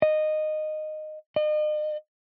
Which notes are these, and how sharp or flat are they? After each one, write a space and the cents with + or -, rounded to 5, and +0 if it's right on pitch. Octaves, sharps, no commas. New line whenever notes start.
D#5 -15
D#5 -40